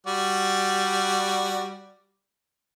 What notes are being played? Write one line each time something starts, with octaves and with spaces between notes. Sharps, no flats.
G3 F#4 D5